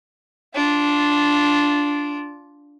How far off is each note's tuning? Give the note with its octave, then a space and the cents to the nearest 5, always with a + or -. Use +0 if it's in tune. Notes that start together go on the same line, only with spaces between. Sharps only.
D4 -10 F4 +0